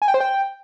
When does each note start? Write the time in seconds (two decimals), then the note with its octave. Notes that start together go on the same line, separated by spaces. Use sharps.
0.02 G#5
0.08 G5
0.14 C5
0.20 G5